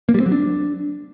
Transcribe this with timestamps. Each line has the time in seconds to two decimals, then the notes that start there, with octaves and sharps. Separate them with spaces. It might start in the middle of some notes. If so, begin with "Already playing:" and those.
0.09 A#3
0.14 G3
0.20 C4
0.26 F#3
0.32 D4